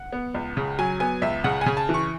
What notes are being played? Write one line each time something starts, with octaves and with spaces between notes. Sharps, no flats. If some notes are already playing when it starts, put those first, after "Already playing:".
Already playing: F#5
B3
C#2
C#3
F#3 G#5
B3 G#5
C#2 E5
C#3 F#5
G#5
C#3
A5
E3
C#6